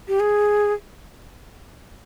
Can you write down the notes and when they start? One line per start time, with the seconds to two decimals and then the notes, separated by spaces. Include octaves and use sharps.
0.08 G4
0.20 G#4